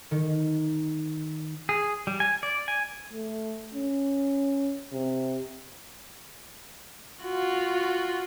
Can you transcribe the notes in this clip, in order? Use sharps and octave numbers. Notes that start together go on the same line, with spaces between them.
D#3
G#4
G3
G#5
D5
G#5
A3
C#4
C3
F4 F#4